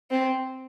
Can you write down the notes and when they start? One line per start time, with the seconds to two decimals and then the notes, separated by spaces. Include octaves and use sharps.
0.11 C4